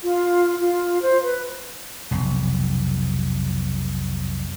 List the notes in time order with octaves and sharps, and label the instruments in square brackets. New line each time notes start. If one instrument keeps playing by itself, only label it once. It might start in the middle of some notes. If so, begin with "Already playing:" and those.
[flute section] F4
F4
C5
B4
[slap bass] F1 B1